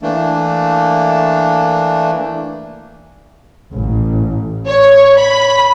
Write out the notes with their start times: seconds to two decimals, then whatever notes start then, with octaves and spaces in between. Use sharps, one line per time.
0.02 E3 A3 A#3 D4
3.73 A1
4.66 C#5
5.18 B5